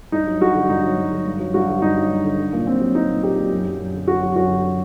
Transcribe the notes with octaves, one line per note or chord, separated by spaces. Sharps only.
G2 D#4
F#3
G2 F#4
D3
G2 D#4
F#3
G2
D3
G2
F#3
G2 F#4
D3
G2 D#4
F#3
G2
D3
F#3
A#2
A#2 C4
F#3
F#3 D#4
A#2
A#2 G4
F#3
F#2
F#3
F#2
D3
F#2 F#4
F#3
F#2 F#4
D3